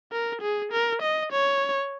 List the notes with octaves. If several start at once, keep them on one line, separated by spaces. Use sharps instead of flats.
A#4
G#4
A#4
D#5
C#5